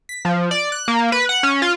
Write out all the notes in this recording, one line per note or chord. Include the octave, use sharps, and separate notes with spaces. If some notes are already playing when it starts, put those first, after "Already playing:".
B6
F3
D5
F#6
A#3
B4
F#5
C#4
F4